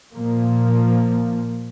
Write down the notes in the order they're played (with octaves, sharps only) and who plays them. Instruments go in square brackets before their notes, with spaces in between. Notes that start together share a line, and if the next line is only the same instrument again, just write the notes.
[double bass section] A#2 F3 A#3